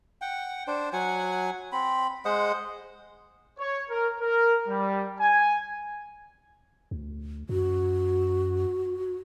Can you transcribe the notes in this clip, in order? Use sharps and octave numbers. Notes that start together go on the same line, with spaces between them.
F#5 G5
D4 C5
F#3 F#5 G#5
C4 B5
G#3 C5 D#5 F#5
C#5
A#4
A#4
G3
G#5
D2
F#2 F#4